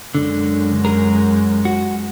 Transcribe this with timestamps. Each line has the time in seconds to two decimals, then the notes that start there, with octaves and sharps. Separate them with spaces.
0.15 F#2 D3 G#3
0.85 G#4 A#4
1.65 F#4